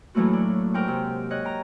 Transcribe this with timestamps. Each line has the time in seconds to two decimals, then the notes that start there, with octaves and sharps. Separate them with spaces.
0.15 A2 E3 F#3 A3 A#3 F#4
0.33 D4
0.74 G#2 A#4 F#5 G5 C#6
0.88 C3
1.30 C#5 D#5 F#6
1.44 G5 A#5